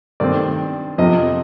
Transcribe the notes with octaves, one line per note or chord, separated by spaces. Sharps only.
G2 D#3 A3 C4 D5
F2 C3 F3 D#5